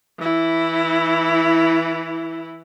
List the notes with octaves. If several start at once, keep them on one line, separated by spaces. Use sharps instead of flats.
E3 E4